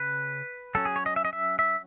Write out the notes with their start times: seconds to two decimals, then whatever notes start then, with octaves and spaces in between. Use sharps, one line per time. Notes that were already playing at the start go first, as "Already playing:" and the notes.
Already playing: C#3 B4
0.75 F#3 C#4 A4
0.85 G#4
0.96 C#5
1.06 D#5
1.16 E5
1.25 D#5
1.33 E5
1.59 E5